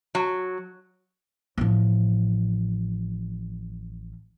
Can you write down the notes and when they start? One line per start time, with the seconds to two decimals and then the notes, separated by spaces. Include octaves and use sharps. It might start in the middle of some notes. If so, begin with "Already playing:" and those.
0.15 F#3
1.58 A1 F3